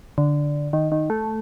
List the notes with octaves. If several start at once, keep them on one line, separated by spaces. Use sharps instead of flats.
D3
D#3
D#3
A3